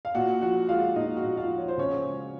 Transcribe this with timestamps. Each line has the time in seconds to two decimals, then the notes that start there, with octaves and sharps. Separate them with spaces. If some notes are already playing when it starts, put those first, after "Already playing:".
0.05 F5
0.15 A#2 F#4 F#5
0.41 F3 F#4 F#5
0.69 G#3 F4 F5
0.96 A#2 D#4 D#5
1.16 F#4 F#5
1.23 A#2
1.37 F4 F5
1.50 F3
1.58 C#5
1.68 C5
1.77 C#3 C#4 C#5
2.05 G#3